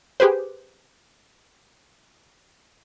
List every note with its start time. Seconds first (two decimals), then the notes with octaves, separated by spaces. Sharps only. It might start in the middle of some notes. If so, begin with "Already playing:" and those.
0.20 G4 G#4 B4 C5